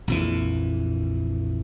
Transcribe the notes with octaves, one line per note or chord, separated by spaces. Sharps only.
A#1 F2 E3